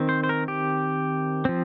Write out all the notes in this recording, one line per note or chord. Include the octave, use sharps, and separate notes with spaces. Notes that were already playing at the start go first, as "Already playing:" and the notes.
Already playing: D#3 C4
C5
C5
A#4
G4
F3 C4